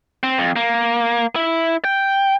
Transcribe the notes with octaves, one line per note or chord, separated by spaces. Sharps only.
C4
F2
A#3
E4
G5